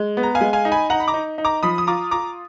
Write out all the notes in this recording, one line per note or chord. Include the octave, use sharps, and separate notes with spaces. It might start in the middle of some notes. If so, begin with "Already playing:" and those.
Already playing: G#3
B3
A#5
F5 G#5
G#3
F5 G#5
D#4
G#5 B5
D#4 F#5 A#5
B5
A#5 D6
D#4
D#4
A#5 D6
F3 B5 D#6
D#6
F4 A#5 D6
F4 A#5 D6